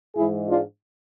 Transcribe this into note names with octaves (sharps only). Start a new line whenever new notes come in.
G#2 E3 G#3 E4 G#4
D4 F4